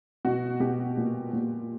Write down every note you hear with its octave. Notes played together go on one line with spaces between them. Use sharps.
B2 F#4
B2 G4
A#2
A#2